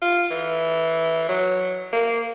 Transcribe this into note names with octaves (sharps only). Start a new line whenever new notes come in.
F4
E3
F#3
A#3